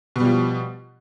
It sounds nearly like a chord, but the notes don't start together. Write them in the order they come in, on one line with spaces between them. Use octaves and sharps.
B2 G3 F3